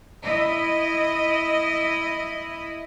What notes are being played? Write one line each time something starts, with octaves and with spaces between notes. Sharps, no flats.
E4 D#5